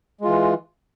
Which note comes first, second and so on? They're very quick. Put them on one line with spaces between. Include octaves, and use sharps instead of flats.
G#3 F4 E3